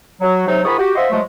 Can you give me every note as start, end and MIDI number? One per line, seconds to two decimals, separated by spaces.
0.21 0.45 54
0.47 0.63 48
0.47 0.63 54
0.47 0.63 63
0.65 0.75 44
0.65 0.75 51
0.65 0.75 65
0.65 0.75 83
0.65 0.75 85
0.65 0.75 87
0.79 0.93 66
0.79 0.93 67
0.95 1.05 65
0.95 1.05 72
0.95 1.05 75
0.95 1.05 76
0.95 1.05 78
0.95 1.05 84
1.10 1.21 48
1.10 1.21 53
1.10 1.21 54
1.10 1.21 56
1.10 1.21 57